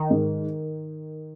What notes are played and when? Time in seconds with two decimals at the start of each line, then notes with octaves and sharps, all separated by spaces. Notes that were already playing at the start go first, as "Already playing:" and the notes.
Already playing: D#3
0.10 G#2